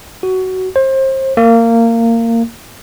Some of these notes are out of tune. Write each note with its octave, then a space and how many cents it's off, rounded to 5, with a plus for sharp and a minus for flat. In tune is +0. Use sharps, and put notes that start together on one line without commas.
F#4 +15
C5 +30
A#3 -20